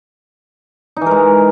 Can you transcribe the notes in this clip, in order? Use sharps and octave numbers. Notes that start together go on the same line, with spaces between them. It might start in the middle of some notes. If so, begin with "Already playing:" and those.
E3 G#3 D#4 A#4